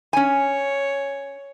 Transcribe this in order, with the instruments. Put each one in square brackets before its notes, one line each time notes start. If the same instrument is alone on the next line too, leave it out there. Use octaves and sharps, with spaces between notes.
[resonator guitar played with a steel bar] C#4 G#5 [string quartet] C#5